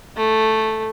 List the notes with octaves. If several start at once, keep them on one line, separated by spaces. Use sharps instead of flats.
A3